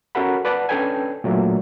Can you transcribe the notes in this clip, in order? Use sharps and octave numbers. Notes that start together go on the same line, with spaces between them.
C#4 F#4 A4 A#4 F#5 B5
B4 D5 F#5 A5
C#4 D4 A4 B4 G5 G#5
A#2 F#3 A3 D4